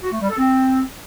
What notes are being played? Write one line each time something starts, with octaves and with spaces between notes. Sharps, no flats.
F#4
A3
G3
A4
C4